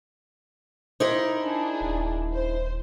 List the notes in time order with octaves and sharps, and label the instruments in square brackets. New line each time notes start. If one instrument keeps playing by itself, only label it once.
[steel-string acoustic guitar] D#4 E4 A#4 [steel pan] C5
[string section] D4 G#4
[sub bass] D#1
[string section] C5